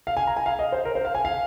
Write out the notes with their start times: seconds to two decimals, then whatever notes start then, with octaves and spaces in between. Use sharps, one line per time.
0.07 F5
0.17 G#5
0.27 A#5
0.37 G#5
0.46 F5
0.59 D#5
0.72 C5
0.85 A#4
0.95 C5
1.05 F5
1.15 G#5
1.25 F5